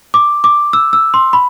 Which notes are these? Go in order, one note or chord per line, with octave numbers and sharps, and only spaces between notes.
D6
D6
E6
E6
C6
B5